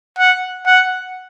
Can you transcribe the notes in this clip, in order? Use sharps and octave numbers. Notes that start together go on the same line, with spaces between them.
F#5
F#5